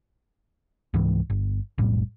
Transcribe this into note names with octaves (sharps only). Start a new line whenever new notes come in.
C#2 G#2 E3
G1
F1 B1 A2 G3